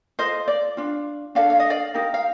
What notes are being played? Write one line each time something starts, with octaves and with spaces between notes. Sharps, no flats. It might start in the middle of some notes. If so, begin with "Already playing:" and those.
F4 A4 C5 D#5
D5
D4 F4
D4 A4 D5 F5
F5
D#5
D5 F5
D#4 G4 A#4
F5